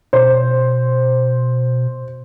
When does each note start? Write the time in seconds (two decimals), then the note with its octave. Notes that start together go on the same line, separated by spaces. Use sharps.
0.13 B2 C5